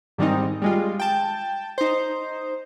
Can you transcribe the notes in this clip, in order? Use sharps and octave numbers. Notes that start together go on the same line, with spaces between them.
G#2 D#3 G3 G#3 C4 D#4
G3 G#3 F4
G5 A5
D#4 C5